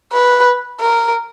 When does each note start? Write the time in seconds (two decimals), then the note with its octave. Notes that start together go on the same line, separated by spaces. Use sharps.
0.13 B4
0.80 A#4